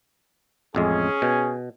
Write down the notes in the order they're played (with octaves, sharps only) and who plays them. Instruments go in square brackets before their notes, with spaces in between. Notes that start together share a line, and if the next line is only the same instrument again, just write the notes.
[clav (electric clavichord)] A1 F2 G#3 [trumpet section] C#4 G#4
[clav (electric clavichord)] B2